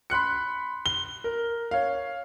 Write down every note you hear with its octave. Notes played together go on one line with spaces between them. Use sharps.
B5 C6 F#6 C#7
G7
A#4
C#5 F5